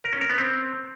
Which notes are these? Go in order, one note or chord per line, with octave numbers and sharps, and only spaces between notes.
A#4
C#4
A#4
B3
C4